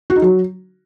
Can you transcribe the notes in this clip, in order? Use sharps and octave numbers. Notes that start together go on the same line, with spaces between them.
F#4
D#4
F#3